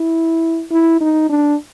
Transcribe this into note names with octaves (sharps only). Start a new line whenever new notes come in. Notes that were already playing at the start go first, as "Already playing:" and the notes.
Already playing: E4
E4
D#4
D4